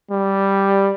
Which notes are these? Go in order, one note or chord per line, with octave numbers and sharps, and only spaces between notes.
G3